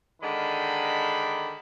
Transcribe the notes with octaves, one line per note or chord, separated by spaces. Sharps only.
D3 D#3 G#3 D5 B5